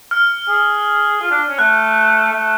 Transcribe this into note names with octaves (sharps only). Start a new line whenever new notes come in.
F6
G#4
F4
D4
C#4
A3 F#6
A3